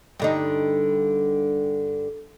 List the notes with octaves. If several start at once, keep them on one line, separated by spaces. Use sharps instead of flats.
G2 D3 D#4